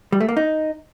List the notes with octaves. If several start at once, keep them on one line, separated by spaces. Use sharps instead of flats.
G3
A3
A#3
D#4